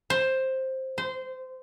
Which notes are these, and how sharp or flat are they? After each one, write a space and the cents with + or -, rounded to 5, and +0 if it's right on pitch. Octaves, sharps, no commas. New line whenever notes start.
C5 +10
C5 -20